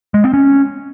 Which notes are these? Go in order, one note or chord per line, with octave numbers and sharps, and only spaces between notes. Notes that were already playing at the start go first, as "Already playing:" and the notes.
G#3
C4
C#4